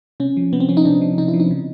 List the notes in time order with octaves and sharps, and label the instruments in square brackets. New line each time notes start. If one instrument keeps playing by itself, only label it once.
[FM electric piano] C3 C#4
F3
C3 B3
C4
F3 C#4
D#4
C3 D4
F3
C3 D#4
E4
F3
D#4
C#3